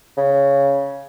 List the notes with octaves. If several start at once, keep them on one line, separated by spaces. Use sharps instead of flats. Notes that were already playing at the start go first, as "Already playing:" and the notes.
C#3